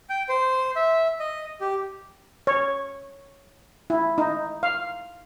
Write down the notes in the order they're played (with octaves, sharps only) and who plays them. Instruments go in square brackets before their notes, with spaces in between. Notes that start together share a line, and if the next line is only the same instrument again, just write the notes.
[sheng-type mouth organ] G5
C5
E5
D#5
G4
[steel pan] C#5
E4
D#4
F5